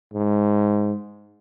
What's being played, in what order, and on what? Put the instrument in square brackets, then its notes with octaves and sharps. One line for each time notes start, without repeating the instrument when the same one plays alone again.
[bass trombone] G#2